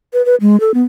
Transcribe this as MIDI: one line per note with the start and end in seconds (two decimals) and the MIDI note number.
0.13 0.24 71
0.25 0.35 71
0.41 0.59 56
0.60 0.74 69
0.74 0.83 59